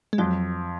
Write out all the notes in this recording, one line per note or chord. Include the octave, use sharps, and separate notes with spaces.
G#3
F2 F#3